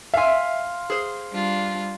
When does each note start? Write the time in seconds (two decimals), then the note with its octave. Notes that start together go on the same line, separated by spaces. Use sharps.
0.14 E5 F5 G#5 C6
0.90 G#4 C5
1.32 G3 D4 F4